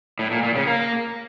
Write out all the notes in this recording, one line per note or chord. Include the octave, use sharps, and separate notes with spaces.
A2
A#2
A#2
C#3
A#3